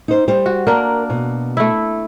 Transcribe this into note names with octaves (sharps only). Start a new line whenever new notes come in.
D#4 C5
G3 C5
F#4
A#3 D4 A#4
B2
A3 E4